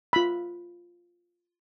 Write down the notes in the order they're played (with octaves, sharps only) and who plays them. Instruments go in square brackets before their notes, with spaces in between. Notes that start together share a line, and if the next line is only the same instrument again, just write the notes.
[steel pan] F4 B5